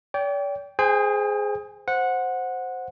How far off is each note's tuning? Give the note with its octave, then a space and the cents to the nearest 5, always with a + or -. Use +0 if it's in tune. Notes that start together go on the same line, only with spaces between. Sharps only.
D5 -45 G5 +0
G#4 +5 C5 -15 G5 +45
C5 +0 F#5 -15